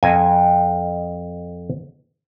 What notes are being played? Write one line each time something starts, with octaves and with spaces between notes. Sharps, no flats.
F2 D#5 G#5